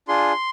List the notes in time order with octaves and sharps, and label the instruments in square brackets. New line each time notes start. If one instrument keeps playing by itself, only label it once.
[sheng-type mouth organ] D4 F4 G#4 C6